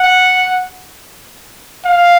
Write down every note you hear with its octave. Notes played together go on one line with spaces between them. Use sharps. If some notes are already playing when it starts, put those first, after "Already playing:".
Already playing: F#5
F5